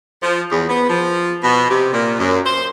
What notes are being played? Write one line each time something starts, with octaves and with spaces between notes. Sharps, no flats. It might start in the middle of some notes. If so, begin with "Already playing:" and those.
F3
E2
B3
F3
B2
C3
A#2
F#2
C5